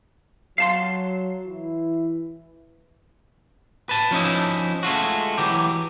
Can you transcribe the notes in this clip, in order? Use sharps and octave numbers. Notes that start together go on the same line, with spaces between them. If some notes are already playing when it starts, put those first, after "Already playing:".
F#3 F5 A5 C6
E3 E4
B4 A5
F3 C#4 D#4 E4
G#3 A3 F4 F#4
E3 F#3 G4